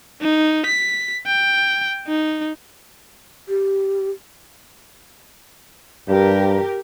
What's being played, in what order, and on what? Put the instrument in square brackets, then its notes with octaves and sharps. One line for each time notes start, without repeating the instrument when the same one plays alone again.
[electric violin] D#4
B6
G5
D#4
[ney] G4
[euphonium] G2 [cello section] G4 A#4